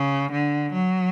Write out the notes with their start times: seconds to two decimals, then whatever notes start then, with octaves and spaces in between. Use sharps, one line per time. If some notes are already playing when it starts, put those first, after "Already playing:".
Already playing: C#3
0.32 D3
0.73 F#3